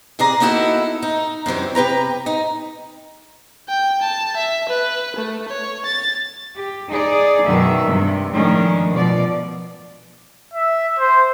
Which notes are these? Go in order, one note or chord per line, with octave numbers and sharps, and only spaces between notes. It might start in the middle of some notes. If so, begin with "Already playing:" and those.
C3 G#4 D5 A#5
A#3 B3 D#4 E4 F#4 A4
D#4
F#2 C3 E3 G3
C3 G4 B4 A#5
D#4
G5
A5
E5
B4
A3
C#5
A6
G4
D#4 G#4 D5
F#2 B2 D#3 F#3 E5
G2 C3
A2 D#3 F3 G#3 C#4 D4
B2 F3 D5
E5
C5